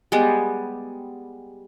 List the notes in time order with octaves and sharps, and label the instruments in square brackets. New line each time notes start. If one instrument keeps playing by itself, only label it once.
[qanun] G3 G#3 B3